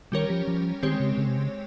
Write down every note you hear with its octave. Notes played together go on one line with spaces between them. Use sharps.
D#3 G3 C#4 G4 A#4 C#5
F3
F3
D#3 G#3 C4 G4 C#5
C#3
C#3
C3
C#3